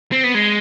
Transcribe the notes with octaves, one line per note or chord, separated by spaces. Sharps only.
C4
B3
G#3